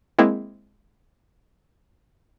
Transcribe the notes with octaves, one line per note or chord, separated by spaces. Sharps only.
G#3 A#3 C4 E4